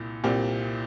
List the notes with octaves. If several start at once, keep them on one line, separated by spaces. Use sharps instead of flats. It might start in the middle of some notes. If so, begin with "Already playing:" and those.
Already playing: C2 A#2
C2 A#2 G3 C4